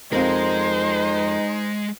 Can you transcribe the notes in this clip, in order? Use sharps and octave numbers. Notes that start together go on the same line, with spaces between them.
F2 G#3 D#4 A#4 C5